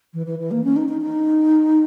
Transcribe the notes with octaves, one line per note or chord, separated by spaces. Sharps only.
E3
E3
E3
A#3
C#4
D#4
D#4
D#4